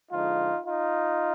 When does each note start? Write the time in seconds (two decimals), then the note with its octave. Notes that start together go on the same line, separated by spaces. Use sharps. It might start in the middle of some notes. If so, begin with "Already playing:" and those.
0.11 D3 F3 G#3 D#4 F4
0.66 D#4 F4